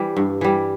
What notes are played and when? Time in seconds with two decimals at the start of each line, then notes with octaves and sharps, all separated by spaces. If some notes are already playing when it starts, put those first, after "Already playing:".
Already playing: E3 G3
0.17 G2
0.41 E3 G3